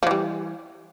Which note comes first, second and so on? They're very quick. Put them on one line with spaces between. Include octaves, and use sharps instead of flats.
F3 E3 G3